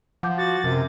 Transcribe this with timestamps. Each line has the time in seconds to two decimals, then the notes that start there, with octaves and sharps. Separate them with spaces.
0.23 F3 F#5 D6 G6
0.38 F#4 A6
0.64 F#2 C3